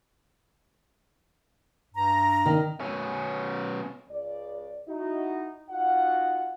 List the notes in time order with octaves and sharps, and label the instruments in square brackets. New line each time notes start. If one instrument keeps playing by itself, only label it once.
[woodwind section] G2 A#5
[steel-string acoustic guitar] D#3
[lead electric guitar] B2 C#4
[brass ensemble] C#2 D5
D#4 E4 F#4
D#4 F4 F#4 F#5